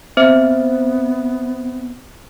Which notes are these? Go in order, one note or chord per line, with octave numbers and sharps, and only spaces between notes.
B3 C4 C5 E5